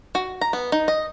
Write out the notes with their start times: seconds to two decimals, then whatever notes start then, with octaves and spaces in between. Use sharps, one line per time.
0.15 F#4
0.41 A#5
0.53 B3
0.72 D#4
0.88 D#5